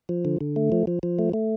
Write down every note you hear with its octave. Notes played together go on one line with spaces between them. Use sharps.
F3
D3
D3
A3
F3
F3
F3
A3
A3